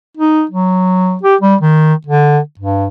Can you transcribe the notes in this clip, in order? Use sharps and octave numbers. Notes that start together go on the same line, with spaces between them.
D#4
F#3
G4
G3
D#3
D3
G2